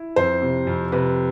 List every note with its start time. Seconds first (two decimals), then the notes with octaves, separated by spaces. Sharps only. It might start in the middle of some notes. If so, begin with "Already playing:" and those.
Already playing: E4
0.16 F2 C5
0.42 C3
0.67 F2
0.92 C3 B4